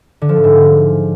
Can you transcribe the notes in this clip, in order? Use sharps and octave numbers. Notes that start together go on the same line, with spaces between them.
D3
F3
A2
G#2